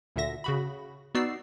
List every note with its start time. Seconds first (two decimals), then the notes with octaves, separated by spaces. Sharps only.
0.16 D2 A#2 D3 E5 A#6
0.44 C#3 F#4 B5
1.15 B3 D#4 F#4 D5 E6 C7